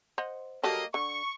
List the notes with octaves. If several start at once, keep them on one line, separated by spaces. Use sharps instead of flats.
C5 D#5 F#5
F#3 G3 A#3 A4 D#5
D3 C#6